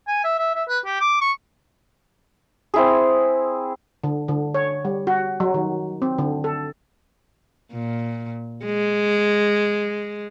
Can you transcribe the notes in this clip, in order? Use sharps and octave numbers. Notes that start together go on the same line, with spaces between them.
G#5
E5
E5
E5
B4
G4
D6
C#6
C4 E4 G#4
D3
D3
C#5
G3
F#4
F#3
D#3
C4
D3
A4
A#2
G#3